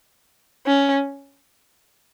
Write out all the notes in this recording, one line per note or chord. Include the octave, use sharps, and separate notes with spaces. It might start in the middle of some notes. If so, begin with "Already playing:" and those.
C#4